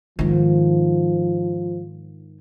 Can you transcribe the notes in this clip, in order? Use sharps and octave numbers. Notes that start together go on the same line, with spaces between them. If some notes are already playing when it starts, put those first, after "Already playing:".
G#2 D#3 F3